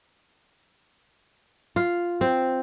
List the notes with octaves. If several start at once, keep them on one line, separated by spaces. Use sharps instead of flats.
F4
C4